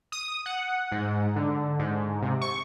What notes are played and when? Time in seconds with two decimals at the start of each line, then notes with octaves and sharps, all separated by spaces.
0.12 D#6
0.46 F#5
0.92 G#2
1.36 D3
1.79 G#2
2.22 C3
2.41 C#6